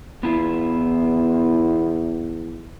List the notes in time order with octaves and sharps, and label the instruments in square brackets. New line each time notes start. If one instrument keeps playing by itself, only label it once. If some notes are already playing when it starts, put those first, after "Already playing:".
[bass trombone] E2 [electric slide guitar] B3 E4 F4